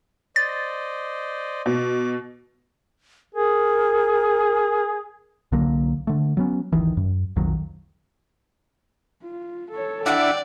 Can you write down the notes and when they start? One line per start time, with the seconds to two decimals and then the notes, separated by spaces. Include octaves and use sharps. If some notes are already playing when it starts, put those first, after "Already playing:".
0.36 C5 D5 D#5 A6
1.66 B2 D6
3.34 G#4 A#4
5.52 C2 D3 F#3 A#3
6.07 D3 A3
6.37 F#3 B3 C#4
6.72 D1 G1 D#3 E3
6.97 F#2
7.36 B1 F2 D#3 F#3
9.24 F4
9.71 A4 C#5
10.06 D4 E4 D5 F#5 G5